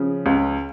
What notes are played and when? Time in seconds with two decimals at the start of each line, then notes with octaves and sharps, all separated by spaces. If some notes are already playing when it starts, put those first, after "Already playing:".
Already playing: C#3 F3
0.26 C#2